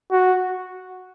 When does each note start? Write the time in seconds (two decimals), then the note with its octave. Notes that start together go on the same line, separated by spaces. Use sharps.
0.11 F#4